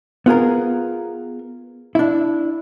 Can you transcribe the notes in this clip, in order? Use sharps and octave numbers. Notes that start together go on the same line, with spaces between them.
B3 F4 G#4 A#4
D4 E4